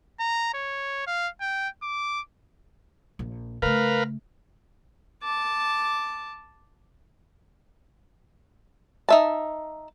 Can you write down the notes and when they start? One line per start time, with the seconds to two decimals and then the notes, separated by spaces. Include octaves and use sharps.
0.20 A#5
0.54 C#5
1.07 F5
1.41 G5
1.83 D6
3.19 A#1
3.62 C#3 A3 A#4 B4 F5
5.23 A5 D6
9.09 D#4 E5 A5